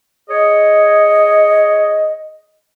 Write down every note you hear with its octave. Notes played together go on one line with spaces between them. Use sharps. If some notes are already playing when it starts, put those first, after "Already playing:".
G#4 C#5 D#5